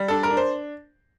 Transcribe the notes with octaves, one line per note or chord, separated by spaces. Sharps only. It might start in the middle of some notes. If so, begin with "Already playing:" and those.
Already playing: G3
D4 A4
A#4
D4
C5